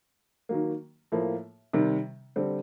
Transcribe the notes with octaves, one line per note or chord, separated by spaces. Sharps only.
D#3 F#3 A#3
A2 F3 A#3
C3 D#3 G3
D3 G3 C4